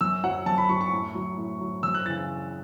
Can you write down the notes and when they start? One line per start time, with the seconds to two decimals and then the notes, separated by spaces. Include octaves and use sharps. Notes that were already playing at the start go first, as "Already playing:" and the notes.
0.01 F#2 E6
0.24 F#3 F#5
0.46 F#2 A5
0.58 B5
0.69 F#3 C#6
0.81 C#6
0.92 A2
1.15 F#3
1.37 A2
1.60 F#3
1.83 F#2 E6
1.95 F#6
2.06 E3 A6
2.09 C#3